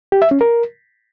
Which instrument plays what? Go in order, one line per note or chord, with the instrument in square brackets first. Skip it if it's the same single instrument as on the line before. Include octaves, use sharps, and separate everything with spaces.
[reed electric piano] G4
E5
C#4
A#4